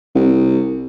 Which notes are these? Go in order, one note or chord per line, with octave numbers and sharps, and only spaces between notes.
C2